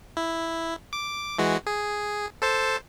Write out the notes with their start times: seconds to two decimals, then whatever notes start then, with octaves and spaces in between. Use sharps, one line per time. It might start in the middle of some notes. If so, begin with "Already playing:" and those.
0.17 E4
0.93 D6
1.39 E3 G#3 F#4
1.67 G#4
2.42 A4 C5 A5